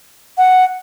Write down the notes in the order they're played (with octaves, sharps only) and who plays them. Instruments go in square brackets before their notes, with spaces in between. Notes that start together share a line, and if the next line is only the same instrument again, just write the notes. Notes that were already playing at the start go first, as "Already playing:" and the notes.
[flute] F#5